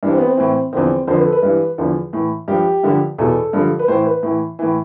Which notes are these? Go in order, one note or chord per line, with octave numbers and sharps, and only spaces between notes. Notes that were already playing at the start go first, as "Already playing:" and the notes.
G2 E3 D4
C4
B3
C4
A2 E3
E2 D3 F3 C4
F2 D3 F3 C5
B4
A4
B4
G2 E3
E2 D3 F3
A2 E3
G2 F3 G4
G2 D3 F3
E2 B2 A4
G2 D3 F3
B4
A2 E3 C5
B4
A2 E3
A2 E3